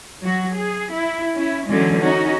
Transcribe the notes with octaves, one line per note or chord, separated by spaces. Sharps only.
F#3 F#4
G#4
E4
C#4 E4
D3 E3 F#3 G#3 C#4
C#4 D#4 F#4